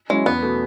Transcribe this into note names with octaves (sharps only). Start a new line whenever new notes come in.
F#3 G#3 C#4 E4
E2 B3
B2 A3